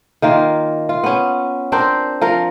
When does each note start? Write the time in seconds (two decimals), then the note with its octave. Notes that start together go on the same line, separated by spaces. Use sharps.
0.22 D#3 A#3 F4
0.89 F4
1.03 B3 C#4
1.72 C4 D4 A#4 C5
2.22 F3 A#4